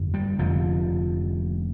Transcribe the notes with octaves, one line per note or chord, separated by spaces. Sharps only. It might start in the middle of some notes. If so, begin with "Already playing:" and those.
Already playing: G1 F2
G3
F1 F2 D3 F3